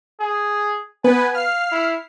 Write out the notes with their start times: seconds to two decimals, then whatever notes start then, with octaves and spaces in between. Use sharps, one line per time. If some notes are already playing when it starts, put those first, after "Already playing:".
0.20 G#4
1.04 B3 B4 G#5
1.35 F5 F6 C7
1.71 E4